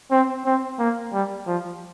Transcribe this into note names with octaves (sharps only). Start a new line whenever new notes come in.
C4
C4
A#3
G3
F3